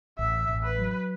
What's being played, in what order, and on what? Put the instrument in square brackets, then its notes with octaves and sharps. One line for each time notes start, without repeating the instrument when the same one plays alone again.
[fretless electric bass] A1 [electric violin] E5
[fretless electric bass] A1
[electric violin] B4
[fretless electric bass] F#3